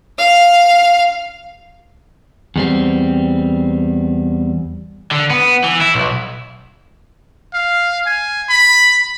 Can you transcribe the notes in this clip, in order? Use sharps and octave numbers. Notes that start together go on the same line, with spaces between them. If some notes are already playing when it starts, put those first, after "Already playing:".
F5
E2 G3 C4
D3
B3
E3
E4
B1
F5
G#5
B5